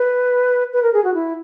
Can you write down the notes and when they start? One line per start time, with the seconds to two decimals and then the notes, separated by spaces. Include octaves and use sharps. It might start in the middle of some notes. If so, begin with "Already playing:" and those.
Already playing: B4
0.73 B4
0.83 A#4
0.94 G#4
1.04 F#4
1.14 E4